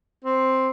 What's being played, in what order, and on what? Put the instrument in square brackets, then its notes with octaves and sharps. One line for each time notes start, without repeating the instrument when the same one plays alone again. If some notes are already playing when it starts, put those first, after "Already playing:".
[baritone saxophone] C4